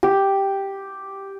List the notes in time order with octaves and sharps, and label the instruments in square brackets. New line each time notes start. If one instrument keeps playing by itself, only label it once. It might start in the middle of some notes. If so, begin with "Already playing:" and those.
[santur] G4